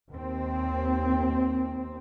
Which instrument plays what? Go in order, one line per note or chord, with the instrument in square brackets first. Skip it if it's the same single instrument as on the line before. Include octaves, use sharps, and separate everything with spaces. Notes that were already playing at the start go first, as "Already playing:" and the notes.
[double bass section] D#2 C4